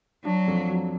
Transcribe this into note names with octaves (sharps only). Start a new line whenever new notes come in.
F#3 D4
F2
F#3